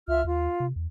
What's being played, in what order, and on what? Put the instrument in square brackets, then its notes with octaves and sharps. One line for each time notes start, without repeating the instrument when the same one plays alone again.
[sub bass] C#2 [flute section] F4 E5 F6
[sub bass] D#2 [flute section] F4
[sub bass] C3
E2